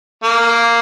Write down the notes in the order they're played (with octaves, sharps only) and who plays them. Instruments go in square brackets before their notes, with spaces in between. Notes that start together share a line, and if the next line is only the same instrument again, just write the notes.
[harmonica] A#3